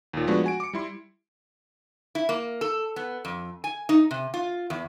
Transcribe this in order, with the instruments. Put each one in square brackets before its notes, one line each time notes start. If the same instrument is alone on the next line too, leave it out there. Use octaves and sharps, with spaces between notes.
[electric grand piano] D#2 A#2
F3 G#3 A3 B3 D4 F#4
F#4 G#5 D7
D6 C#7
G3 E4 C6
[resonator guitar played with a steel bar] E4
A#3
A4
B3
F2
G#5
D#4
C3
F4
E2